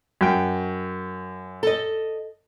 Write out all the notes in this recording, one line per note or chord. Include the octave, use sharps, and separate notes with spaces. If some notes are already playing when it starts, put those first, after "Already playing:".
F#2 G5
A4 D#5